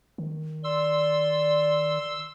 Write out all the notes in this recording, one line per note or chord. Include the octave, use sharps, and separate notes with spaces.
D#3
D5 C6 E6